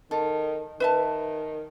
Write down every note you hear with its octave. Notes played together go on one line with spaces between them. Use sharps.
D#3 A4
D#3 B4 E5 A5